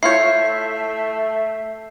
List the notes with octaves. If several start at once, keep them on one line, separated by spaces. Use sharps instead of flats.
A3 E4 F4 C#5 E5 G6 C7